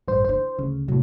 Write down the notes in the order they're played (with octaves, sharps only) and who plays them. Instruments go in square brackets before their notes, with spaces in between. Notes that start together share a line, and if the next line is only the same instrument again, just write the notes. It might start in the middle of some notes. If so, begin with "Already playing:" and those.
[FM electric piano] A1 G2 C5
[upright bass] E3 D4 [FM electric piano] C5
[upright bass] D2 [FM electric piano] C#3
[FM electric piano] A2 F#3 [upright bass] C3